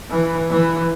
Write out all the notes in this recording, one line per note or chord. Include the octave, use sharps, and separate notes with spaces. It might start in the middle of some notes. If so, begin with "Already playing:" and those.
E3
E3